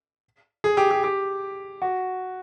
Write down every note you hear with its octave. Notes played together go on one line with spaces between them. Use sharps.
G#4
G4
G4
G4
F#4